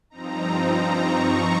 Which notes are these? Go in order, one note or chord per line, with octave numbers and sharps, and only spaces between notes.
G2 F3 C4 D#4 A#5
A#5
C#6